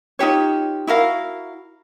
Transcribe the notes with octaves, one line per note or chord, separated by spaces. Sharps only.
D#4 F4 G4 C#5
E4 F#4 A#4 F5